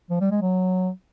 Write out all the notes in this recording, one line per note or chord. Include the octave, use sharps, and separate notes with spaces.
F3
G3
G#3
F#3